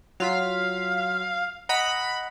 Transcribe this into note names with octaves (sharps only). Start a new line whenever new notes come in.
F#3 F4 F5 B6
D#5 F#5 A#5 B5